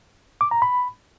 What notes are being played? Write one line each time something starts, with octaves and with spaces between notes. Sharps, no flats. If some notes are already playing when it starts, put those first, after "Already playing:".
D6
A#5
B5